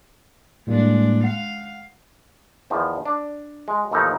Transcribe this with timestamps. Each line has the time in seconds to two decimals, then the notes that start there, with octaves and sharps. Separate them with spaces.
0.67 A2 G3 G#3 A#3 D4
1.24 F5 F#5
2.70 E2 D#3 F3
3.05 D4
3.68 G#3
3.91 D#2 A2 E3 F3 D#4